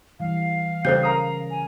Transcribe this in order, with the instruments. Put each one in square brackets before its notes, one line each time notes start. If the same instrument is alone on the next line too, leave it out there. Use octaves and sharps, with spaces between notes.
[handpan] E3 G3 [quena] F5
[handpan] C#3 C#4 [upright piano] G3 [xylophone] A4 C5 G6
[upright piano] A#4 A#5 D#6
[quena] G#5